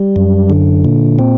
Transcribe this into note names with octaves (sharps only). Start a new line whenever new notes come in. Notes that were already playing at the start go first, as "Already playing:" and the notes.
Already playing: G3
F#2
D3
A#2
C4